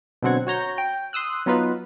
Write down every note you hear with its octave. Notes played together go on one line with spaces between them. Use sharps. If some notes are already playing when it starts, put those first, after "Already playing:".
B2 D3 F#3 C4 F#5 G#6
F#4 C#5 A#5 G6
G5
C6 D#6 E6 F#6
F#3 B3 D#4 F4 B4